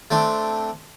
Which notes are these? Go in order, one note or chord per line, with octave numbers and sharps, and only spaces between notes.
A3 C4 D4